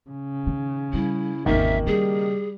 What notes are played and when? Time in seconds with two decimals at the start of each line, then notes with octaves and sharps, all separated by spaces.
0.10 C#3
0.47 D#3
0.93 G3 E4
1.46 G#1 E2 D#3 A#3 E5
1.87 C#3 G3 G#4